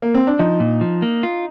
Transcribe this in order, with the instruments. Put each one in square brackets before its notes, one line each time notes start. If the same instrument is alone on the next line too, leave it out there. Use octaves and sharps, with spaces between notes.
[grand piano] A#3
C4
D4
[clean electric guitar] F3 [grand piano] D#4
[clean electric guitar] A#2
F3
A#3
F4